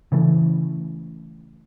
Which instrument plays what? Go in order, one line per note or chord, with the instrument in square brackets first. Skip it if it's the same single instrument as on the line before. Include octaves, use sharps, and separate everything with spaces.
[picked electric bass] C#3 E3 A3